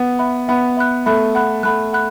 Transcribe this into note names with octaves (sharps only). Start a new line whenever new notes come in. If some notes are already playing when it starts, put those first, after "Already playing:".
Already playing: B3
E5 B5 F#6
B3 E5 B5 F#6
E5 B5 F#6
A3 E5 B5 F#6
F#5 B5 F#6
A3 F#5 B5 F#6
F#5 B5 F#6